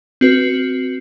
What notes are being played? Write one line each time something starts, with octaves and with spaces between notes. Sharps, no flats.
C4 F#4 B4